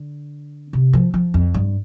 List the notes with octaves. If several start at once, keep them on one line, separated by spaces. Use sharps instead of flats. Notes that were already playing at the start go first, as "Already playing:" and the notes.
Already playing: D3
C3
F3
F3
F2
G2